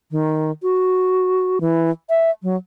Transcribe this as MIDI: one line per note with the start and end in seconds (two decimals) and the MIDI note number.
0.11 0.51 51
0.63 1.59 66
1.61 1.90 52
2.10 2.31 76
2.43 2.56 54